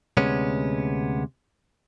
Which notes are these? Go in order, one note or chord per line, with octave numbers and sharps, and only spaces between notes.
D2 C3 G#3 B3 C#4